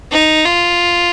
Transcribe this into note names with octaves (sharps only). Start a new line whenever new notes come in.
D#4
F4